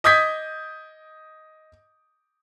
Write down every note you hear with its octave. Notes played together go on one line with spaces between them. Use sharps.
D#5 D#6 G6 G#6 B6